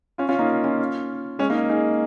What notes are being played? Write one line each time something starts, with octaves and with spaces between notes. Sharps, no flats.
C#4 F4
C#4 F4
A#3 D#4
C#4 F4
G#3 C#4
A#3 D#4
D#4 G#4